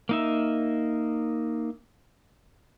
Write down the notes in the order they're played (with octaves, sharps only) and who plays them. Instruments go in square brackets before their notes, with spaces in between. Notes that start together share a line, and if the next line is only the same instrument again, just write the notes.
[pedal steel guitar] A#3 D#4 E5